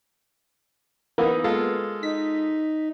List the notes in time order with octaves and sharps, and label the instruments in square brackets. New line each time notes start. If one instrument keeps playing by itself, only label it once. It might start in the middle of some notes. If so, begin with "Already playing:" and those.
[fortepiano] E3 D#4 [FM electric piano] A#3 B3
[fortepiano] G#3 F4 A4
[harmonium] D#4 [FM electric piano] B6